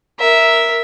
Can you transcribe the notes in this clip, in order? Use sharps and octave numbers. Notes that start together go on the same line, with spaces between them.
A#4 E5